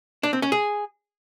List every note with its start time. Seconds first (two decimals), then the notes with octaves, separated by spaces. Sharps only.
0.23 D4
0.33 C4
0.42 C#4
0.52 G#4